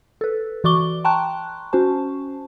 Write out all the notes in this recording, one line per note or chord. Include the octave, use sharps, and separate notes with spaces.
A4 B4
E3 F#4 D5 C#6 D6 G7
G5 A5 A#5 C6 C#6 F#6
C#4 F#4 C5 A5